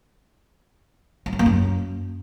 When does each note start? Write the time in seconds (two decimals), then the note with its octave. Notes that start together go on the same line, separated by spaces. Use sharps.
1.26 F#3
1.33 F3
1.39 A#3
1.46 F#2